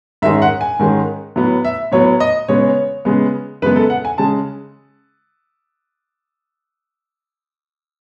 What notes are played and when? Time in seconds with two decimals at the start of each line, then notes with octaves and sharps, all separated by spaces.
0.22 G#2 D#3 G#3 C#4 E5
0.42 F#5
0.61 G#5
0.79 G#2 D#3 G#3 C#4
1.36 A2 F#3 B3
1.65 E5
1.92 A2 F#3 B3 C#5
2.20 D#5
2.48 C#3 G#3 B3 C#5
3.05 C#3 G#3 B3
3.62 F#2 C#3 G#3 B3 B4
3.76 A4
3.90 F#5
4.05 G#5
4.18 C#3 G#3 A5